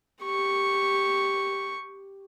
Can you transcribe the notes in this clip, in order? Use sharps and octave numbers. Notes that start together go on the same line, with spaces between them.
G4 C#6